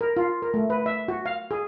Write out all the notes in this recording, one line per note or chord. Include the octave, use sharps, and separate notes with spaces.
A#4
F4
A#4
A3
B4
E5
F#4
F5
G#4